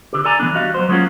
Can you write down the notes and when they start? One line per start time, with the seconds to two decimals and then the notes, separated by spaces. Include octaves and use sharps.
0.13 D3 G4
0.25 A4 D5 G#5 A#5
0.40 E3 F3 B3 D4
0.55 G3 F#4 D#5 F5
0.74 F#3 B3 C5
0.89 F#3 G#3 A#3 C#4 F4 F#4